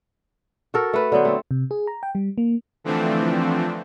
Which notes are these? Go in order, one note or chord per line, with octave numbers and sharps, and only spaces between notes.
F#4 A4 A#4
A3 B4
D3 F#3 B3 C5
A3 C4
C3
G#4
A#5
G5
G3
A#3
D3 E3 F3 A3 C4 D4